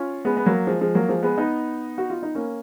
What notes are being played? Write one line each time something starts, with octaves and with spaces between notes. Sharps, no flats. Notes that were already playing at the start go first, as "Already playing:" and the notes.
Already playing: C#4 F4
G#3 B3
B3
F#3 A#3
F3 G#3
F3 G#3
F#3 A#3
F3 G#3
G#3 B3
B3 D#4
F#4
F4
D#4
A#3 C#4